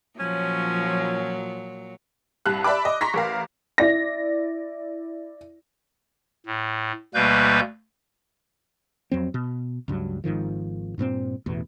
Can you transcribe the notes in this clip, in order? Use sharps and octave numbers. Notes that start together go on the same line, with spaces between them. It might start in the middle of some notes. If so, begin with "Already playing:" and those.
A#2 F3 F#3 C#4
C2 G2 F#6
D5 E5 A5 B5 D6
D#5
A#5 C6 C#6 A#6 B6
A1 A#4 F5
E4 D5 A#6
A2
D2 B2 G3 A#3 B4 G6
F2 F#3 C4
B2
C#2 G2 F#3
G#1 G#2 D#3 F3
G2 A#2 B3 C4
A1 E2 B2 E3